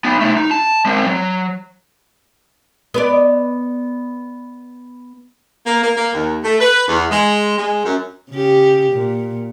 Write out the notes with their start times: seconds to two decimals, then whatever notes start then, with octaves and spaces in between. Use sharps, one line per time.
0.05 B3 D#4
0.21 A3 D#4
0.37 D#4
0.51 A5
0.86 G#3 C4
1.06 F#3
2.94 B3 B4 D5
5.66 A#3
5.81 A#3
5.97 A#3
6.14 D#2
6.44 A3
6.60 B4
6.88 E2
7.10 G#3
7.57 G#3
7.85 F#2
8.30 C#3 G4
8.92 A#2